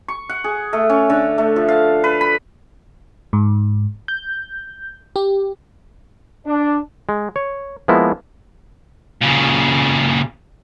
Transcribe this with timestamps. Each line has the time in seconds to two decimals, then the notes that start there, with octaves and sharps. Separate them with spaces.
0.08 C#6
0.29 F#5
0.44 G#4
0.73 A3
0.89 C#4
1.10 D3
1.38 A3
1.56 F3
1.68 F5
2.04 B4
2.21 B5
3.33 G#2
4.08 G6
5.16 G4
6.47 D4
7.09 G#3
7.36 C#5
7.88 F3 G#3 A#3 B3 E4
9.21 A#2 C#3